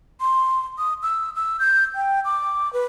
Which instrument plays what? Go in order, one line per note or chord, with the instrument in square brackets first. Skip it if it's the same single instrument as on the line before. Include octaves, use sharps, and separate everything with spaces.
[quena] C6
D#6
E6
E6
G6
G5
D6
B4